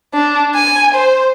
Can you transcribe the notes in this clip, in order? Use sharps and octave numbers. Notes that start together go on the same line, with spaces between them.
D4
G#5
C5